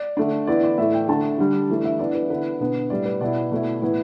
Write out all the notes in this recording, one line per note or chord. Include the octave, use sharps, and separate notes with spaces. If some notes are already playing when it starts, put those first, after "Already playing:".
Already playing: D5
D3 A3 D4
E3 B3 E4 D5
D5
A2 E3 A3 E5
G5
D3 A3 D4 A5
D3 G3 D4
E3 A3 D4
E5
E3 B3 D4 D5
B4
D3 B3 E4 B4
B2 B3 D4
A2 G3 E4 D5
B4
B2 B3 E4 D5
B2 A3 E4
A2 E3 B3 E4